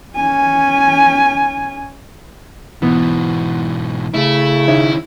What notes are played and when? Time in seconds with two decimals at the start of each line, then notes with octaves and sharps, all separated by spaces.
0.16 C#4 G#5
2.82 G#2 B2 E3 B3
4.15 C#3 A3 E4
4.68 D#3 C#4 D#4 C#5 E5